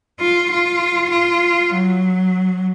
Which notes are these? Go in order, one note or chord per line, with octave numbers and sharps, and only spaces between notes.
F4
F4
F4
F#3